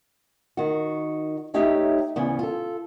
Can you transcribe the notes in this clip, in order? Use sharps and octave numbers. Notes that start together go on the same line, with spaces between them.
D#3 F#4
A3 D#4 G4 C#5 E5
D2 C#3 E3 B3
F4 A4